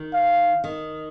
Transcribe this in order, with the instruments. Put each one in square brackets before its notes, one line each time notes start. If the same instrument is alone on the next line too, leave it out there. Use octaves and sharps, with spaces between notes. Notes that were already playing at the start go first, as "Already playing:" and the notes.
Already playing: [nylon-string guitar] D#3
[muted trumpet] F5
[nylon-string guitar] D#3